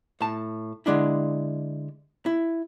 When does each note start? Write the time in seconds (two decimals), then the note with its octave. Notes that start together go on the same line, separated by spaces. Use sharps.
0.21 A2 A5
0.86 D3 G#3 D4 E4
2.26 E4